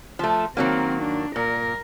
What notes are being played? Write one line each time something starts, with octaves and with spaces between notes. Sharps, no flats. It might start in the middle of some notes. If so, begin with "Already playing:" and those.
F3 A3
D#3 F#3 A#3 C4
D4
A#2 A#4